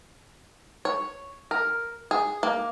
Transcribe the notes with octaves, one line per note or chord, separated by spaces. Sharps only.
C#5
A#4
G#4
A#3